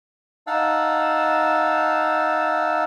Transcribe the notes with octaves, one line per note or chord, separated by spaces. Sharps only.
D#4 F5 F#5 A5 E6